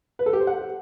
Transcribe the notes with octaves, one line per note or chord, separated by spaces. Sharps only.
B4
A4
G4
C5
F#5